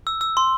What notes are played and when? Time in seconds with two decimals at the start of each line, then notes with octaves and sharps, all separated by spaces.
0.07 E6
0.21 E6
0.37 C6